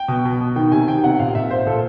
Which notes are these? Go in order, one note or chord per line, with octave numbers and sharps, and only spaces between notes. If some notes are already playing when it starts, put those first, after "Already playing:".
Already playing: G5
B2
B2
B2
D#3 G5
C3 G#5
D#3 G5
C3 F#5
A#2 F5
A#2 E5
A#2 C5
A#2 A4